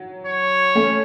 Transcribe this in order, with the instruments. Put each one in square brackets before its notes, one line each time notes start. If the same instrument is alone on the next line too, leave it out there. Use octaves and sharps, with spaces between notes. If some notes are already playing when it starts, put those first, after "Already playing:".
Already playing: [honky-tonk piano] F#3
[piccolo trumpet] C#5
[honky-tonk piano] A3 C#4